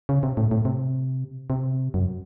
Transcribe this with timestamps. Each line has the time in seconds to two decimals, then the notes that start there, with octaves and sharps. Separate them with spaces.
0.09 C#3
0.23 C3
0.37 A2
0.51 A2
0.65 C3
1.50 C3
1.94 F#2